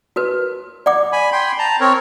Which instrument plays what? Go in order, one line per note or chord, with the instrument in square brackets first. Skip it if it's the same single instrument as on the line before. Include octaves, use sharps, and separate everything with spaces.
[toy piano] F#4 A#4 B4
D5 F#5 D6
[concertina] G#5 B5
G5 B5 C6
A5 A#5
C4 A#4 C#5